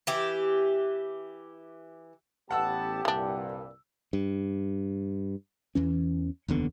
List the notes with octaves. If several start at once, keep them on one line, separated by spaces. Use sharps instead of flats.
E3 G4
A1 B3 G4 F#5 A5 E6
C2 G2 A#2 E3 D4
G2
E2 E3 C#4
F1 D#2 D3 B3